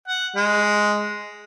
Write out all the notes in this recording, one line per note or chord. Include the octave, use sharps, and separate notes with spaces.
F#5
G#3